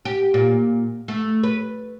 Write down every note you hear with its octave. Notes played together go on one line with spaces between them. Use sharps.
G4
A#2
A3
B4